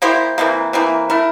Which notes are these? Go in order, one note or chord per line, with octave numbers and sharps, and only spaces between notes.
A#3 E4 G4 C5
C3 E3 A#3
C3 E3 A#3
A3 E4 A#4